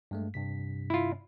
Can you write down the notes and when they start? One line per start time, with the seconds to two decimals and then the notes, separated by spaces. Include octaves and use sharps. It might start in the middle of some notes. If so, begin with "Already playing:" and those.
0.11 G2 G#3 A3
0.34 G2 C3 B6
0.90 E4 F4